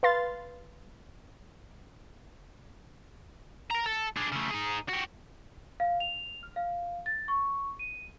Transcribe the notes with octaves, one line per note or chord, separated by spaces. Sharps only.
B4 F5 C6 A6
A#4 A#5
A4
D4 G#4
C#3 A3
D#4 G#4
F#4 G4
F5
F7
F6
F5
A6
C#6
D#7